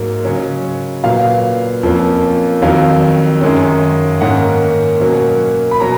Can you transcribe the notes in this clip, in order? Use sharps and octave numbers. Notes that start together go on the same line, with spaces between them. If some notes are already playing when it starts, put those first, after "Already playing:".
Already playing: G#2 F#3 A#3
C#3 F#3 C#4
A#2 F#3 B3 F5
F2 F3 A#3 C#4
F2 D#3 F#3 F5
F#2 D#3 G#3 C#4
G#2 D#3 A#3 C#4 F#5
B2 F#3 A#3 C#4
B5
B2 F#3 A#5